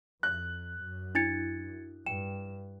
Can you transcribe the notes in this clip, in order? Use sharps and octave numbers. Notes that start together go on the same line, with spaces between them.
F2 F#6
F#2
D4 E4 G#6 A6 C#7
G2 G5 E7